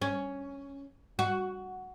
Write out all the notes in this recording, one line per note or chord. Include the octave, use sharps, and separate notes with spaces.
C#4
F#4